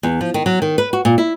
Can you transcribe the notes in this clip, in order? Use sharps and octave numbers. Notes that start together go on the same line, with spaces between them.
E2
F3
D#3
F#3
D#3
B4
F#4
A#2
E4